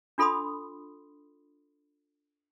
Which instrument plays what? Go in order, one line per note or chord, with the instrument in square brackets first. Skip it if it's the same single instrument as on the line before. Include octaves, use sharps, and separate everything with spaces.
[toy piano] D4 F4 A4 B5 C6 D#6